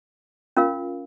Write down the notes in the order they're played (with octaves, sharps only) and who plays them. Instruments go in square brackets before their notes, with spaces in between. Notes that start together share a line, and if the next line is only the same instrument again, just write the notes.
[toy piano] C#4 F4 A#4 F5